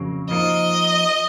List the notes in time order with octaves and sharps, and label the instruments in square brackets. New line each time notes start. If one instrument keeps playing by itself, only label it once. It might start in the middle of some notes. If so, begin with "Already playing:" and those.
Already playing: [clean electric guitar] F2 C#3 F#3 A#3
[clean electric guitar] F3 A#3 D#4 [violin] D#5